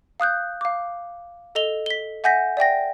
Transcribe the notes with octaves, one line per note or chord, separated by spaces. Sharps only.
F5 D#6 F#6 G6
F5 D6
A4 D#5 F7 G7
B6 G7
E5 F#5 G#5 G6 A#6 B6
D5 E5 G5 A#6